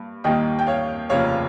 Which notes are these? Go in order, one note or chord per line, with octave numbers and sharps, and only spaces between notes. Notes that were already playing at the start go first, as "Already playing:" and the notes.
Already playing: G2 A#3
D#2 D#3 G3 A#3 D#5 G5
G5
C#5 F5
F1 D#2 C#3 F3 A#3 C#5 F5